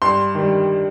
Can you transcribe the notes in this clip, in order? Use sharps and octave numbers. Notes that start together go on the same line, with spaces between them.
G2 C6
D#3 G3